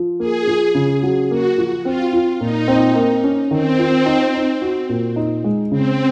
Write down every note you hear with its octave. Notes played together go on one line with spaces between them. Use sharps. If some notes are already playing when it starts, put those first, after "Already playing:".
Already playing: F3
A#3 G#4
F3
C#3
F#3
A#3 F#4
F3
C4 F4
F4
A#2 D#4
C4
A#3
C#4
D#3 C4
F4
D#4
D#4
F#4
A#2
D#4
G#3
C#3 C4